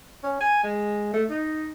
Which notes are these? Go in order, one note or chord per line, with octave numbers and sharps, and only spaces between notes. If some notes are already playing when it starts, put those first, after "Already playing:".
C#4
G#5
G#3
A3
D#4